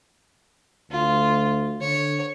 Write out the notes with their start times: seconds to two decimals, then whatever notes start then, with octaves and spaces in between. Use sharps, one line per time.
0.91 D2 F4
1.81 D3 C#5